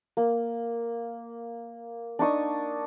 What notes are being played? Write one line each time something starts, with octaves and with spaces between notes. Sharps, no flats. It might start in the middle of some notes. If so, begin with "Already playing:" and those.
A#3
D4 D#4 C#6 D#6